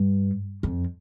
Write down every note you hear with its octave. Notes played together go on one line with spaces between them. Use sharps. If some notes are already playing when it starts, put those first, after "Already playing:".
Already playing: G2
F2